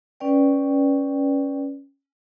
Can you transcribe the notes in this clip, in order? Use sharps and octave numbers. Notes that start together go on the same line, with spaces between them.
C#4 B4 D5 G5